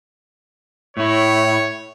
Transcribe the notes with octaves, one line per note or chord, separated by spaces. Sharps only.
A2 E4 C#5